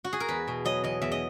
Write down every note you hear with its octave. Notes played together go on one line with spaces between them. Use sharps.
F#4
G#4
A#4
E2 B4
B2
F#3 D#5
E2 D#5
E2 E5
D#5